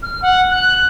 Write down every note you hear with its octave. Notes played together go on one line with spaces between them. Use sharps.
F6
F#5
F#6